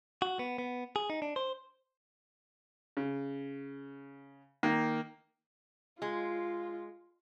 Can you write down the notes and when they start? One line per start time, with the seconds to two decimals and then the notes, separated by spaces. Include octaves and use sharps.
0.22 F#4
0.39 B3
0.58 B3
0.96 G#4
1.10 D#4
1.22 D4
1.36 C5
2.97 C#3
4.63 D#3 A#3
6.02 G#3 F4